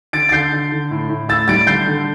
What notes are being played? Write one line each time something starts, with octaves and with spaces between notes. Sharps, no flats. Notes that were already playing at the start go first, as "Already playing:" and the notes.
D3 A6 D7
A6
D3 G6 C7
D3
D3
A2
A2
A2 E6 A6
G3 A6 D7
D3 G6 C7
D3